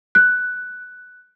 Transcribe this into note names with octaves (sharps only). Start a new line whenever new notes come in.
F#6